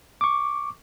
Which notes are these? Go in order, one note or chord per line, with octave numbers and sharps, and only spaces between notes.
C#6 D6